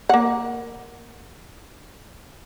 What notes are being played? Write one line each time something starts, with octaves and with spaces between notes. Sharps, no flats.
A#3 F#5